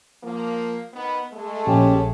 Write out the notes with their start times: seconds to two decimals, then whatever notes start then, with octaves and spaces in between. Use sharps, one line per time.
0.23 F3 A#3
0.94 D#3 B3
1.33 G#3 A3
1.67 A#1 C#4 G4